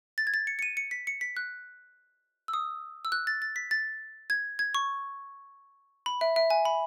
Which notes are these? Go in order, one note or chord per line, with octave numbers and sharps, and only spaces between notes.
A6
G#6
A6
C#7
C#7
D#7
C#7
B6
C#7
B6
F#6
E6
D#6
E6
F#6
A6
A6
B6
A6
G#6
G#6
C#6
B5
E5
E5
G#5
B5